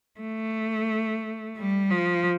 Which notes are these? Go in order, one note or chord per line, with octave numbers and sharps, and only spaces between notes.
A3
G3
F3